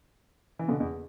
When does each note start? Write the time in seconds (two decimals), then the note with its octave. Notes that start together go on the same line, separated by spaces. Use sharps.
0.59 E3
0.68 B2 D3
0.80 E2